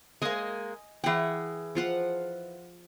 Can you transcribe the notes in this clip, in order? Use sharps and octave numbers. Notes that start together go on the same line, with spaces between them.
G#3 A#3 D#5 G#5
E3 G#4 F#5 G5
F3 F4 F#5